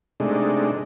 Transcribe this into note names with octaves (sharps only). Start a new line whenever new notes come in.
C3 G#3 A3 D4 D#4